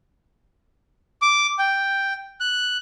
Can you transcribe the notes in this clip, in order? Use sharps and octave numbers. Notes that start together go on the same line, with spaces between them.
D6
G5
F#6